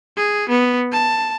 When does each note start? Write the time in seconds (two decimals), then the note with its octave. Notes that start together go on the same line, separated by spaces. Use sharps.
0.17 G#4
0.49 B3
0.92 A5